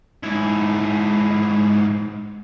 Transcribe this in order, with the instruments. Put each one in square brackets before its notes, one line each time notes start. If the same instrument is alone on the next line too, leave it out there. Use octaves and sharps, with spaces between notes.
[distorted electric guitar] G#2 E4